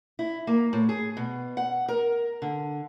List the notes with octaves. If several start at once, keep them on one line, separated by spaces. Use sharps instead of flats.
E4
A#3
A2
G#4
B2
F#5
A#4
D3